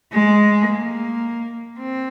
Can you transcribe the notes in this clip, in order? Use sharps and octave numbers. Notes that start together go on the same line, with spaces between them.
G#3
A#3
C4